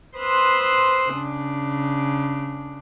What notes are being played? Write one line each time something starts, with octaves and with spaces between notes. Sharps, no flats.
B4 C5 C6 D#6 E6 F#6
C#3 D4